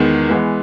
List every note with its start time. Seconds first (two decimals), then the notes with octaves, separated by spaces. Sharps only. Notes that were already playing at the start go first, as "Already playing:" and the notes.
Already playing: E2 D#3 G#3 B3
0.29 E3 G#3 B3